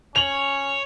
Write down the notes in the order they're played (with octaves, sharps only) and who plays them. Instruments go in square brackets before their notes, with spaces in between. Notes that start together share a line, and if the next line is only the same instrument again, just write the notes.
[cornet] C#4 [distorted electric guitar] C#5 [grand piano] F7 F#7